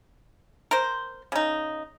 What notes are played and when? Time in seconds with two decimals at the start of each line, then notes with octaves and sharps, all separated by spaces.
0.71 A#4 C5
1.32 C#3 D#4